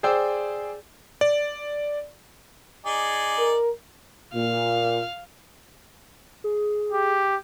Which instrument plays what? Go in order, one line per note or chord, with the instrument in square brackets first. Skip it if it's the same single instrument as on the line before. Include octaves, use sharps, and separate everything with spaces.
[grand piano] G#4 C5 D5 G5 E6
[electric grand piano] D5
[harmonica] D#4 G#4 D5
[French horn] A#4
[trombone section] A#2 [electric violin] F5
[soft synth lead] G#4
[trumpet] G4